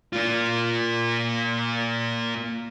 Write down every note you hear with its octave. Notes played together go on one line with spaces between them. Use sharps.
A#3 F4